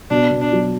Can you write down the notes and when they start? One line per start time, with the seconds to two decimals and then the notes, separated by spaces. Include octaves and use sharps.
0.10 B2 D4
0.31 B2
0.41 D4
0.52 F#3